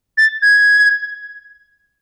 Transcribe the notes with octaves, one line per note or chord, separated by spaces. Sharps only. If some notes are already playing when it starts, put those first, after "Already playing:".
A6
G#6